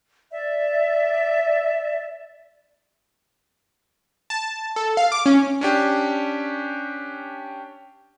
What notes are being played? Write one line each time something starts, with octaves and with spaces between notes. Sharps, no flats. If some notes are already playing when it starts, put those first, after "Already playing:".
D5 E5
A5
A4
F5
D6
C#4
C#4 D4 G4